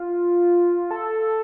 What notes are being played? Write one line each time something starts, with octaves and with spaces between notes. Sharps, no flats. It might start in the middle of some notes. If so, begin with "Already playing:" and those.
Already playing: F4
A4